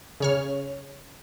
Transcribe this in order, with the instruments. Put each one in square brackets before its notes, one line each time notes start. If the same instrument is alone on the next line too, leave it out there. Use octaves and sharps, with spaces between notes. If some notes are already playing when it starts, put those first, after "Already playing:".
[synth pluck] C#3 C#5 F6